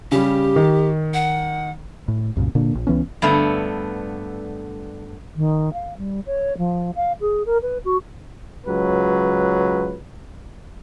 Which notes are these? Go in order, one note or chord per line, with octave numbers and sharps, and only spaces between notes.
C#3 G3 G4
D#3
F#5
A2
C2 F#2 A#2 C#3
A#2 D3 A#3 D4
A#1
C#2 E3 B3 C#4
G2 D3 A3 B3
D#3
F5
G3
C#5
F3
F5
G#4
A#4
B4
F#4
C#2 F#3 B4